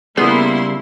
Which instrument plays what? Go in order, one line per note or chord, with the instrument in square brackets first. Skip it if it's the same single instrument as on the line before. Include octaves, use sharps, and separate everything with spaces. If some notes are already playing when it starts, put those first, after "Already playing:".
[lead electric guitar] C#3 G3 [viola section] A#3 E4 C6 [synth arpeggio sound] B3 G#4